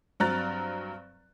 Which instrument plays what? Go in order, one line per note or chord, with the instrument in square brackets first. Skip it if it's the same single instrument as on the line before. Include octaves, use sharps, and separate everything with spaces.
[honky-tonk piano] G2 F#3 C4 A#5 F#6 A6